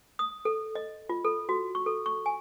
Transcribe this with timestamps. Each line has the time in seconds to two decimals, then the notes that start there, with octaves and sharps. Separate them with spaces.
0.19 D#6
0.45 A4
0.75 D#5
1.09 F4
1.25 A4
1.49 F#4
1.75 C#6
1.86 A4
2.06 C#6
2.26 G#5